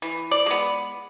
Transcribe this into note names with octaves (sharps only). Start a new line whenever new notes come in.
E3
D5
G#3 B3